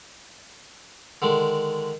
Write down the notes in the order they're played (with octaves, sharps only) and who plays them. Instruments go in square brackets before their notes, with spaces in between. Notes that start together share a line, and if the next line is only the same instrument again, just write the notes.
[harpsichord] D3 D#3 G#3